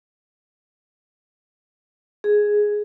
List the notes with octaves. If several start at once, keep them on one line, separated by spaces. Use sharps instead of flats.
G#4